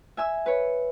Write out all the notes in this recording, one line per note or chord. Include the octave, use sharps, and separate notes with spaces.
E5 G#5 E6
B4 C#5